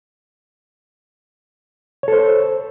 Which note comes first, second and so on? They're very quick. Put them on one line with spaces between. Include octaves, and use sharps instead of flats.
C#5 A4 C5